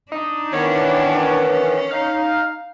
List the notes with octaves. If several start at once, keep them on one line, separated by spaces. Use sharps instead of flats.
D4 D#4
D#3 E3 B3 C#4 C#5
D#4 F5